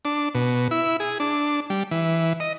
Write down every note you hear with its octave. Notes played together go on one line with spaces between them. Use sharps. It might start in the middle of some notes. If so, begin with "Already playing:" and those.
D4
B2
E4
G#4
D4
G3
E3
D#5